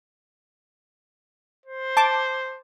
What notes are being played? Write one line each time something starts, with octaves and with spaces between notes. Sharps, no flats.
C5
A5 D6